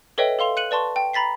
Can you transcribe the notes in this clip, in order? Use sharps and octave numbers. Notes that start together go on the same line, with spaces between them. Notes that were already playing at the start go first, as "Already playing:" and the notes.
A4 B4 C#5 D#5 E5 G5
A4 F5 C6 F7
F#6 C#7 D#7 F#7
B4 D5 A5 C6 C#6
G5
A#5 B5 A6 B6 C7